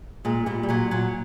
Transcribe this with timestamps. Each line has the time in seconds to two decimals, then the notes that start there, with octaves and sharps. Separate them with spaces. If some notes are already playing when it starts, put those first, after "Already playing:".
0.25 A#2 G#3
0.46 A#2 G3
0.63 G3
0.69 A#2 F#3
0.91 A#2 F#3